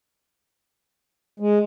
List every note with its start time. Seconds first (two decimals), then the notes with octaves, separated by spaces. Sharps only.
1.40 G#3